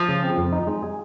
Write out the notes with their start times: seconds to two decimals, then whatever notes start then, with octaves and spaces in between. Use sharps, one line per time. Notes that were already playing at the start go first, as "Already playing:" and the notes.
Already playing: F3
0.08 C#3
0.23 C4
0.38 F2
0.52 D#4
0.67 G#3
0.83 G#4